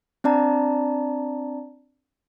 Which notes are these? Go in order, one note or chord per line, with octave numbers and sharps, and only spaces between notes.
C4 D4 D5 A5 A#5